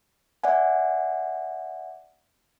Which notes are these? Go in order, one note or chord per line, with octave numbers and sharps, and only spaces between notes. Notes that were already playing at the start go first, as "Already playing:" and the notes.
D5 E5 F#5 G#5